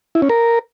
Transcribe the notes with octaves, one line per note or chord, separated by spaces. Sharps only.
E4
C#4
A#4